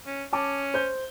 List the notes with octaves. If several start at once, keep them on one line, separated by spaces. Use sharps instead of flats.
C#4
C#4 A5 D6
C5 G6